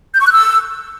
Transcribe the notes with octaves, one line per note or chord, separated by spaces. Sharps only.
G6
C#6
F#6
E6